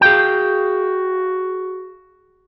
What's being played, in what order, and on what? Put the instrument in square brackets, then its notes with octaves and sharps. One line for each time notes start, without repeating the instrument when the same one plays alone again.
[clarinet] F#4 [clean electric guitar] G#4 F5 G5